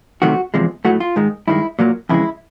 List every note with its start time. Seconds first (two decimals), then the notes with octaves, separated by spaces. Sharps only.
0.22 C3 D#3 F#3 A3 F#4
0.54 E2 C3 F3 G#3
0.85 A2 F#3 A3 F#4
1.00 F4
1.16 G#2 D#3 G#3
1.48 G2 D#3 G#3 E4
1.79 A#2 F#3 A#3
2.09 F2 C#3 E3 G#3 E4